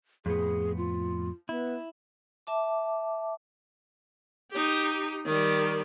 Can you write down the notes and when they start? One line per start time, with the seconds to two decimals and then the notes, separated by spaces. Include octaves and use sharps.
0.26 F2 A2 B3 G#4
0.77 F4
1.49 B3 E4
2.47 E5 A5 D6
4.51 D#4 G4
5.26 D#3 G3